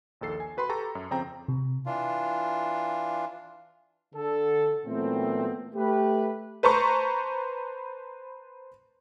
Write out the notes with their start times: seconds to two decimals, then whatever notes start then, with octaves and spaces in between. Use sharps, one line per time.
0.21 A#1 D#2 A4 C7
0.40 G#5
0.57 F#4 B4 B5 C6
0.69 G4 A4 A5 A#5 C#6
0.95 F#2
1.11 F2 C#3 C4 G5 A#5
1.48 C3
1.86 E3 D4 F4
4.15 D3 A4
4.86 A#2 E3 F#3 A3 B3 C4
5.75 A3 G4 B4
6.63 B4 C5 A5 A#5 C6 C#6